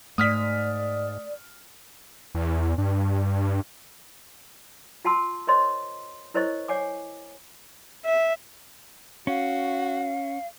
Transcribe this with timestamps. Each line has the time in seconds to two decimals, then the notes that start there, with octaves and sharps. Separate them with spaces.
0.18 G#2 A3 D5 D#6 F6 B6
2.35 E2
2.78 G2
5.05 F4 F#5 A5 C6 E6
5.47 A#4 C5 C#5 D#5 C6
6.34 E4 A#4 C5 C#5 D#5 C#6
6.68 C#5 F#5 G#5 D6
8.05 E5
9.27 C#4 F#4 F5